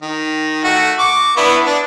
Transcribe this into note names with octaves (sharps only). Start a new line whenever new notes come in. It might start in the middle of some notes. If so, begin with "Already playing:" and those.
D#3
A3 F#4
C#6 D6
B3 D4 E4
D4